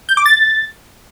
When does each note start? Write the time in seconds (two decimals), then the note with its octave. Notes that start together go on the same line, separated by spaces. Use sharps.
0.09 G6
0.17 D6
0.26 A6